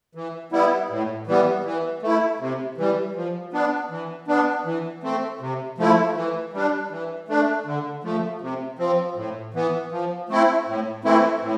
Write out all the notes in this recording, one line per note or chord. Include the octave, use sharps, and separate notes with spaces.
E3
G3 B3 E4
A2
E3 G3 B3
E3
A3 E4
C3
E3 G3
F3
B3 D4
E3
B3 D4
E3
A3 C4
C3
F3 A3 E4
E3
G3 D4
E3
A3 D4
D3
F3 A3
C3
F3 C4
A2
E3 B3
F3
A3 C4 E4
A2
E3 A3 C4 E4
A2